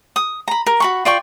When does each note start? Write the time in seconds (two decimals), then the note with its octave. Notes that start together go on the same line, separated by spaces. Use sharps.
0.16 D#6
0.48 A#5 B5
0.67 A#4
0.80 F#4 B5 C#6
1.05 F4 D5 G5 C#6